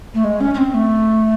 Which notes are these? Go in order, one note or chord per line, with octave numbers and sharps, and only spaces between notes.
A3
G#3
C#4
C#4
C4
A3